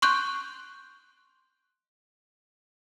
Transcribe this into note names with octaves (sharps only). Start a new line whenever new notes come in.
C6 C#6 F#6 G6